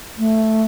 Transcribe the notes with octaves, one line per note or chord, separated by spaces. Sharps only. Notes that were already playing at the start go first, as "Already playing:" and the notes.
A3